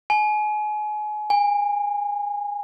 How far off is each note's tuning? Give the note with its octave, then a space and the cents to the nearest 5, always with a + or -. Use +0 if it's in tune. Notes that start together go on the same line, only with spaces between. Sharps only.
G#5 +30
G#5 -25